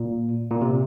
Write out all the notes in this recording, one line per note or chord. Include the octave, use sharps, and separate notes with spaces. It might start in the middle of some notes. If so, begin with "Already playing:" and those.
Already playing: A#2
A#2
C3